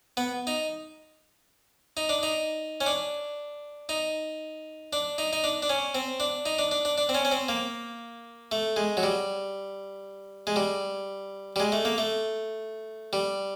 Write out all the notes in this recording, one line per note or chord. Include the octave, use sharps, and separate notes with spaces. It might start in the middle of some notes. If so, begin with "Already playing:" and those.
B3
D#4
D#4
D4
D#4
C#4
D4
D#4
D4
D#4
D#4
D4
D4
C#4
C4
D4
D#4
D4
D4
D4
D4
C4
C#4
C#4
C4
A#3
A3
G#3
F#3
G3
G#3
G3
G3
G#3
A3
A#3
A3
G3